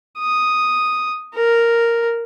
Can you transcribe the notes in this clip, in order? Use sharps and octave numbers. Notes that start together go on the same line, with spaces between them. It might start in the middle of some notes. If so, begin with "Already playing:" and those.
D#6
A#4